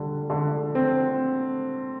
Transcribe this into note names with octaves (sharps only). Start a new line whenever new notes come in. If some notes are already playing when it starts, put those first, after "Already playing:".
Already playing: D3 G3
D3
C4